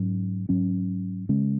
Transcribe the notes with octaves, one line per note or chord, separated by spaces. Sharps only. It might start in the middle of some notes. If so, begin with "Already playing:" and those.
Already playing: G#2 F#3 C#4
G#2 F#3 C#4
C#3 G#3 C#4